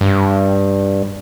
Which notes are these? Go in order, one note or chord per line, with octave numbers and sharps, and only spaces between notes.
G2